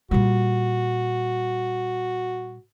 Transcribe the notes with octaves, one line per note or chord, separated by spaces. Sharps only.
A#2 G3 F#4